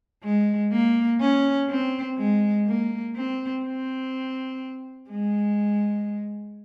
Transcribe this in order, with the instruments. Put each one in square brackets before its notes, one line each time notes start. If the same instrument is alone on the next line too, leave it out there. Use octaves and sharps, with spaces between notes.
[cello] G#3
A#3
C#4
C4
G#3
A#3
C4
C4
G#3